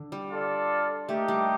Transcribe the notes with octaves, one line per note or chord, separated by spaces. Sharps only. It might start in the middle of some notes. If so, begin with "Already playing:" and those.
Already playing: D3
G3
F4 A4 D5
A3 A#3 D#4 G4
G3